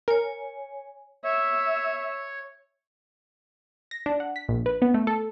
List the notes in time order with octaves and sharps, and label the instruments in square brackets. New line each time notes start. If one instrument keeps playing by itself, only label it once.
[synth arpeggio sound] A#4 [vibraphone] C#5 G#5
[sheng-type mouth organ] C#5 [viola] E5
[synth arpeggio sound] A#6
D4
F#5
B6
A#1
B4
B3
A3
A4